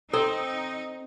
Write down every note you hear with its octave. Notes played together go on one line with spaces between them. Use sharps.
C4 D#4 A4